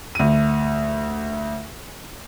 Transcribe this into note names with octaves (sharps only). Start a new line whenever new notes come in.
D2 D#7